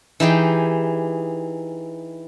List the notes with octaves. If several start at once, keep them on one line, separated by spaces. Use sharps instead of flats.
E3 D#4 G4 G#4